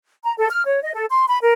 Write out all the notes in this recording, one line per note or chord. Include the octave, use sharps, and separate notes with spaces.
A#5
A4
F6
C#5
D#5
A4
C6
B5
A#4